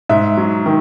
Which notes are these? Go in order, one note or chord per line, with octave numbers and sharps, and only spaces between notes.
G#2 E5
F#3
D#3